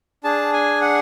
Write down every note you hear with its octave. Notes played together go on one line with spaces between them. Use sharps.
D4 G#4 A5
G#5
F#5